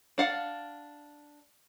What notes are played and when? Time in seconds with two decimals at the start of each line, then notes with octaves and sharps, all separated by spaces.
0.18 D4 F5 F#5